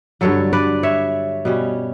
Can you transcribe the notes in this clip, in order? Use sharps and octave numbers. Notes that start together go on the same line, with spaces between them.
G2 D3 F#3 A4 C#5
B4 D5
C#5 E5
B2 G3 C#4